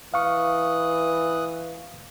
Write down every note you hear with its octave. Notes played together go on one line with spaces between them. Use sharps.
E3 F5 C#6 D#6 F#6